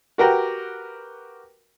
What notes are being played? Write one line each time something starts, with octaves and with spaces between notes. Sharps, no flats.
F#4 G4 A#4 B4 F#5 G5